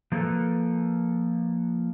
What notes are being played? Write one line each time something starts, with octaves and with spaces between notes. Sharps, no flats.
F3 A#3 D#4 F4 A4 B4